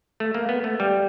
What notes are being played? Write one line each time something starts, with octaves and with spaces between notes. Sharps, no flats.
A3
A#3
B3
A3
G3